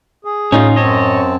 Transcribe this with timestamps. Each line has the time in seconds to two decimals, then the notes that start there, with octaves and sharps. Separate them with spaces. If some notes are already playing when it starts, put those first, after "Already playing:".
0.25 G#4
0.52 A2 C#4 D#4 F4
0.76 F#2 C4 C#5 D#5 A5